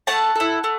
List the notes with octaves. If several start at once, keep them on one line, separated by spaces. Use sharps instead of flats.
A3 F#5 A5
E4 A4
A3